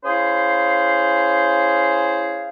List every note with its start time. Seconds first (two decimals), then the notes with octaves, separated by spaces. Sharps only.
0.04 C#4 E4 G#4 C5 F5